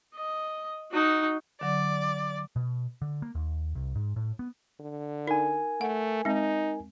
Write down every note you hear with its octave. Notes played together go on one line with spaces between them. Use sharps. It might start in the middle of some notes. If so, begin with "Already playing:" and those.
D#5
D#4 F#4
D3 F#3 D5
B2
D3
A#3
D#2
C2
G#2
A2
B3
D3
D#4 A#4 G#5
A3 F#5
G#3 C4 D#4